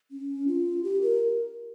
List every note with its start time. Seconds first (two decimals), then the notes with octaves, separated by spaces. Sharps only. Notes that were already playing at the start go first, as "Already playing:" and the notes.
0.11 C#4
0.48 F4
0.84 G4
1.02 A#4